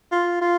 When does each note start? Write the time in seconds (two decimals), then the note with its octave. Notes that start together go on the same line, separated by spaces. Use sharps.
0.12 F4
0.41 F4